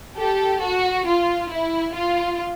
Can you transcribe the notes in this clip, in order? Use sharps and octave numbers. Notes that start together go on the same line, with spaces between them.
G4 A4
F#4
F4
E4
F4